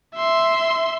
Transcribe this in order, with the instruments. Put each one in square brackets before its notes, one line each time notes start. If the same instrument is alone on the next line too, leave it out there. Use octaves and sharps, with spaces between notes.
[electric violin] E5 C6